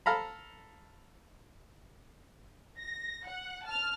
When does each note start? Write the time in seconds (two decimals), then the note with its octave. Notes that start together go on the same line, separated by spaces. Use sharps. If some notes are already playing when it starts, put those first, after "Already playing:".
0.06 A4 F5 A#5 B5
2.78 A#6
3.27 F#5
3.65 A5 F6